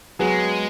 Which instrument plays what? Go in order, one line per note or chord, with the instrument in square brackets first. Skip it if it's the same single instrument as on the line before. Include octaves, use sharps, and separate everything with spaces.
[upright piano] F#3 B3 G#4 [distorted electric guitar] G#3